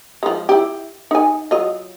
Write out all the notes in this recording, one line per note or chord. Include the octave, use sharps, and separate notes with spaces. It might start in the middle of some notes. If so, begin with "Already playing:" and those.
F3 G#3
E4 G4
D#4 G#5
F#3 F4 D#5